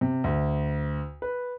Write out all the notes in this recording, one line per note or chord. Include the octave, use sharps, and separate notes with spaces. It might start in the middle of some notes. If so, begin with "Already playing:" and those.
C3
D2
B4